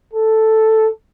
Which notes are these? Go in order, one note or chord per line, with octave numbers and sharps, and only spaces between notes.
A4